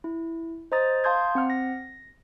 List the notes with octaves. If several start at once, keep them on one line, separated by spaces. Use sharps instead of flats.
E4
C5 D#5 A#5 D#6 A6
F5 A5 C6 D#6 G6 G#6
C4 F#5 F6
A#6